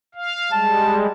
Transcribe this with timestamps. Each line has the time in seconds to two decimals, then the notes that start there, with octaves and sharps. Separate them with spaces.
0.15 F5
0.52 G3 G#3 A5